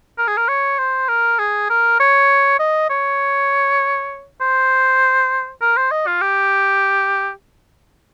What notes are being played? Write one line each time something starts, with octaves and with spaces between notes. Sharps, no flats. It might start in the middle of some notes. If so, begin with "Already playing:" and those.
A#4
G#4
A#4
C#5
C5
A#4
G#4
A#4
C#5
D#5
C#5
C5
A#4
C5
D#5
F4
G4